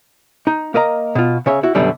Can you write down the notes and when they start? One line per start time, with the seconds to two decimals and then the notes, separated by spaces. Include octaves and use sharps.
0.47 D#4
0.74 A#3 A#4 D#5 A#5
1.15 B2 F4
1.46 C#3 C#5 E5
1.63 E4 F#4
1.75 F#2 B2 D3 F#3 G3